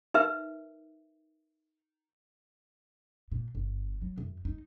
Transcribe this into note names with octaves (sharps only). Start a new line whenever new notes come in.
D#4 A#4 B4 E5
A#2
G1
F#3
F#2
D#4